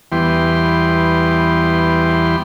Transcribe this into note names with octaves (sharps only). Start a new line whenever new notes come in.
E2 E3 G3 B3 G5 C6